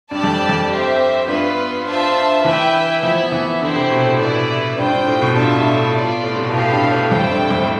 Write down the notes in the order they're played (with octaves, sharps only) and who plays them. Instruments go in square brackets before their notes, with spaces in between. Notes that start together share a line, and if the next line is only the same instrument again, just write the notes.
[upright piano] G2 [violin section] G4 D5 A5
[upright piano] F2
F2
[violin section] C4 G4 C5 E5
[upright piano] G2 [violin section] B3 F4 B4
[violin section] D4 F4 C5 E5 A5
[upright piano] E3 [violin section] E4 B4 E5 G5
[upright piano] F3 [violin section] B3 E4 A4 E5
[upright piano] E3
[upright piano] D3 [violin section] E4 G4 C5
[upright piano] C3
B2
A2
[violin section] E4 B4 D5
[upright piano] G2 [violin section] F4 C5 G5
[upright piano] G2
A2
B2
[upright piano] G2 [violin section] F4 A4 E5 A5
[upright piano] G2
A2
[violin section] B3 F4 A4 D5
[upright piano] A2
C3
B2
[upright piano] A2 [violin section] E4 G4 B4 F5 A5
[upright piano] G2
A2
[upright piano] F2 [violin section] E4 A4 C5 G5
[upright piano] G2
F2
A2